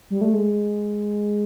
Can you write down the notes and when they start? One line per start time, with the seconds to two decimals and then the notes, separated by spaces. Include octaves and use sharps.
0.10 G3
0.21 A3
0.33 G#3